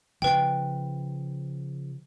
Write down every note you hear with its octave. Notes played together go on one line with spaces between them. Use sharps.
C#3 F3 B4 G5